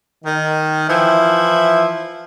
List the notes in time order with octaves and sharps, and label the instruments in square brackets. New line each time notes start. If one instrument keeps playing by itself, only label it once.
[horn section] D#3
E3 F3 E4